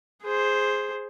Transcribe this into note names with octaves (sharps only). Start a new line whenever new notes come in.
G#4 C5